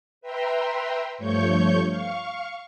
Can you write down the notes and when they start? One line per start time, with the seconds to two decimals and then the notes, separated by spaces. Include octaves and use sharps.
0.21 B4 E5 G5 A#5 C6
1.18 G2 F3 A3 C#5 C#6 G6
1.88 F5 C#6